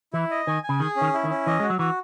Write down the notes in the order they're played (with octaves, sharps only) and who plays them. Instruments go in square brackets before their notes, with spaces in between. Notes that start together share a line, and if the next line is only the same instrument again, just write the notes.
[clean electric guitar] E3 [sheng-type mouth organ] E4
[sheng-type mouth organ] D#5
[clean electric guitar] D#3 [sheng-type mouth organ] G#5
[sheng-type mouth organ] G#5
[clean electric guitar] C#3
[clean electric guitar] D#3 [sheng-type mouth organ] G#4
[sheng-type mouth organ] C#4
[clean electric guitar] D#3
[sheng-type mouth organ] E4
[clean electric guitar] D#3
[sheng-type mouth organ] C#4
[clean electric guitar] E3 [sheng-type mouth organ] D#5
[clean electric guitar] G#3 [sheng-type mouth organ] F#4
[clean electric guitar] F#3
[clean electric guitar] E3 [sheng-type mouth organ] F#4